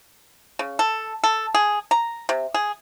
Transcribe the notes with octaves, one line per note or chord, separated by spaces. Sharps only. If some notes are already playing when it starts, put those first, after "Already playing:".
C#3
A4
A4
G#4
A#5
C3
G#4